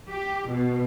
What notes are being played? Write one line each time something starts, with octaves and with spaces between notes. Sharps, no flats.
G4
B2